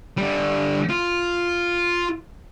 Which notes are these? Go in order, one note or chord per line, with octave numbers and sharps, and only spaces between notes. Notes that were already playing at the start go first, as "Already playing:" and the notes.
D3 G3
F4